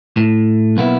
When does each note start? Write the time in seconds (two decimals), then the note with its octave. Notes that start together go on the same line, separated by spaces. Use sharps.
0.17 A2
0.77 B1 A#3 B3 E4